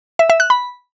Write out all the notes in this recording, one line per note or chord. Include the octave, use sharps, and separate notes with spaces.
E5
E5
F#6
B5